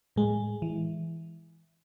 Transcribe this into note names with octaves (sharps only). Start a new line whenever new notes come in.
A2 G#3
E3